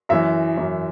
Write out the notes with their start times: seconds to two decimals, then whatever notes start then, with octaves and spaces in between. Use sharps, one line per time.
0.09 F#2 E3 E5
0.57 F#2 E3